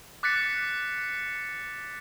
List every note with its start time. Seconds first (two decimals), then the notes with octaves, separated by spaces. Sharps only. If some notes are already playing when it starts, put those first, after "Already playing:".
0.23 D6 F#6 A6 B6 C#7